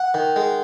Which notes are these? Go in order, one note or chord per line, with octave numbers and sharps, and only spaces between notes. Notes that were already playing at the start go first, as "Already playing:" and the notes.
Already playing: F#5
D#3
G#3